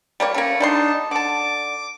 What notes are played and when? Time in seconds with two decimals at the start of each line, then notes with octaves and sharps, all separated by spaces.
0.20 G3 A#3 C#5
0.34 A3 A#3 C#4
0.60 G3 D4 D#4 A#4 A5 C6
1.11 D3 A5 D6